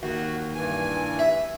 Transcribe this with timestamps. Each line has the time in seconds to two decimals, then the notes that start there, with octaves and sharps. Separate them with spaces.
0.03 D#2 F#4
0.54 G2 E3 G#5
1.19 E5